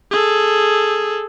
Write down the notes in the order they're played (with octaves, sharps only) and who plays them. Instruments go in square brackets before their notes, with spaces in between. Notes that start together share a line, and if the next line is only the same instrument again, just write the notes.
[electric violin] G#4 A4